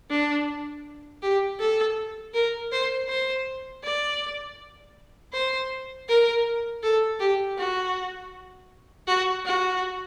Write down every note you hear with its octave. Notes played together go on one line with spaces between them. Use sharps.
D4
G4
A4
A#4
C5
C5
D5
C5
A#4
A4
G4
F#4
F#4
F#4